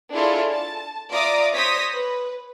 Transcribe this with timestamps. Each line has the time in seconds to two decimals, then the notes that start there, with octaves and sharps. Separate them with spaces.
0.14 D4 E4 F4 G#4 A4 C#5
0.50 A5
1.11 F4 D5 E5 A#5 D6 D#6
1.55 C5 C#5 D#6 A#6 B6
1.93 B4